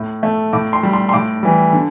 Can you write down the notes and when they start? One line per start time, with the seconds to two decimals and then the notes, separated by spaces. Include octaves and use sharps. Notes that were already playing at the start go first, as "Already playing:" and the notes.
Already playing: A2
0.23 A3
0.53 A2 D6
0.73 C6
0.83 G3
0.93 C6
1.09 C6
1.13 A2 D6
1.43 E3 G3
1.73 D3